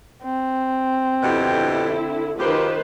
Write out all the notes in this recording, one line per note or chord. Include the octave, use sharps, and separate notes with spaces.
C4
F2 B2 D3 E4 G4
F#2 D#3 F4 G4 B4 C5